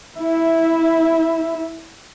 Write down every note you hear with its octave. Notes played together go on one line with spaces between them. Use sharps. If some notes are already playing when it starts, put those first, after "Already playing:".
E4 E5